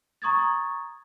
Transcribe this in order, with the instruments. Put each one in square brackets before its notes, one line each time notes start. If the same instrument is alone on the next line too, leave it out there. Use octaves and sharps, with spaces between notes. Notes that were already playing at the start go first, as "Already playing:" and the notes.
[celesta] A#5 C#6 D#6 G#6 A6